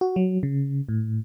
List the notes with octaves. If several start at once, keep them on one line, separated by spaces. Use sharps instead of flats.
F#4
F#3
C#3
A2